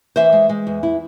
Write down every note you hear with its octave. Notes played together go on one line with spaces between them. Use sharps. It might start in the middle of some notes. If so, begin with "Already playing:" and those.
E3 C5 E5
G#3
G#3
E2
E4